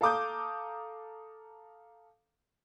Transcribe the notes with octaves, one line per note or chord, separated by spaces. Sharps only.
A4 F5 A#5 D6 D#6 G6